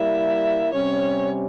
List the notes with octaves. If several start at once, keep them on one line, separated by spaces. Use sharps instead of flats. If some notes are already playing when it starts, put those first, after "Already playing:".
Already playing: G3 A#3 E4 E5
C3 G3 C#4 C#5